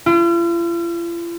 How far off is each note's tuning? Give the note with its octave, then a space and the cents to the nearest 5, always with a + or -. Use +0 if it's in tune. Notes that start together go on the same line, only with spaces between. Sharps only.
F4 -45